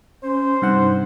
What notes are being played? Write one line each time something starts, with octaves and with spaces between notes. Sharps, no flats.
C#4 C5
G2 C3 D#4 F#5